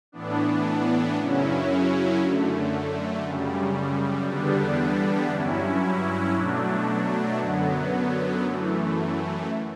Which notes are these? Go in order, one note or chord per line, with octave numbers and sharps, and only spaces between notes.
A2 E3 B3 D4
F#2 C#3 F#3 C#4 E4
F#2 D3 A3
F#2 C#3 G3
E2 D3 G3 B3 D4
G2 F#3 C#4 E4
B2 F#3 A3 D4
F#2 D3 F#3 B3
F#2 E3 A3